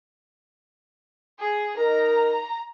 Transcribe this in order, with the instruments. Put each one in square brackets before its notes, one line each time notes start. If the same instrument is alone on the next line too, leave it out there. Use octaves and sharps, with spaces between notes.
[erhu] G#4
[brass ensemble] D#4 A#4 [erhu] A#5